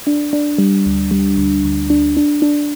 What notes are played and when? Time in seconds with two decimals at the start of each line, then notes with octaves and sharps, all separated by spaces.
0.07 D4
0.33 D4
0.58 G3
0.86 D2
1.11 G3
1.37 D2
1.63 D2
1.90 D4
2.17 D4
2.42 D4